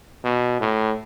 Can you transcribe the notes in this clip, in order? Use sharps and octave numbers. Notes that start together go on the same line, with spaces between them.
B2
A2